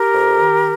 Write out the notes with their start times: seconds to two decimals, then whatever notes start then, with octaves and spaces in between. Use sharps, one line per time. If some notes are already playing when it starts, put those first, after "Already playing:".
Already playing: G4 A#4
0.12 F2
0.38 D#3